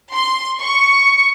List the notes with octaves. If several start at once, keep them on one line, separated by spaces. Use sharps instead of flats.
C6
C#6